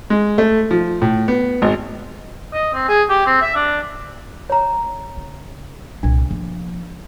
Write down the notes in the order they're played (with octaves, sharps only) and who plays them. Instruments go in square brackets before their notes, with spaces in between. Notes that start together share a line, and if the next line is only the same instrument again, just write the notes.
[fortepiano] G#3
A3
F3
A2
B3
G#1
[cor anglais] D#5
C4
G#4
G4
C4
E5
D4
[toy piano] C#5 A#5
[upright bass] C#3
[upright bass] C2 A#2 [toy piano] D4
[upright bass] F3 A#3